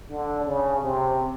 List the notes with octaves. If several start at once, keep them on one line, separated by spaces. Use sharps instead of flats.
D3
C#3
C3